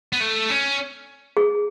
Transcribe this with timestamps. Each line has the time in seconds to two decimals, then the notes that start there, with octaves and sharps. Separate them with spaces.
0.13 B3
0.20 A3
0.50 C#4
1.37 G#4